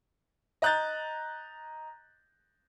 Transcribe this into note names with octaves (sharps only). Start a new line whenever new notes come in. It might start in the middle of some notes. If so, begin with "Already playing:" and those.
D#5 A#5 F#6 G6 A6